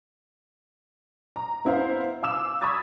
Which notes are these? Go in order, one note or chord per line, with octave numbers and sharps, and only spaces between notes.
A#5
B3 E4 C5 F5
F5 D6 E6 E7
B5 C#6 D#6 G#6 A6